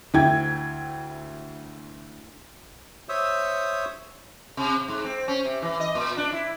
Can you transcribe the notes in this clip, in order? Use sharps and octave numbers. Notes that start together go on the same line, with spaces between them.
D2 E4 G5 G#6
C5 C#5 E5 D#6 E6
C3
G#2
C4
C#4
C3
E3
D#5
A#2
D4
E4